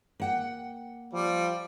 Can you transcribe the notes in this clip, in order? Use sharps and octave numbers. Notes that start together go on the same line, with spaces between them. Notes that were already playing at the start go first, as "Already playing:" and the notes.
A#3 F#5 G5
F3 G3